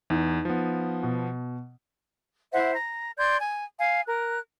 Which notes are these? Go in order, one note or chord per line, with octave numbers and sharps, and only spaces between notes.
E2 D#4
F3 B3
B2
E4 C5 E5 F#5
A#5
D5 C6 G6 G#6
G#5
F5 G#5
A#4 F#6